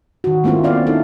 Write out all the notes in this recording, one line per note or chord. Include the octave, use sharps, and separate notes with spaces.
D#3 F#4
A3 A#3 C4 E4 F4
B3 C#4 D5 F5
C4 D#4 E4 A4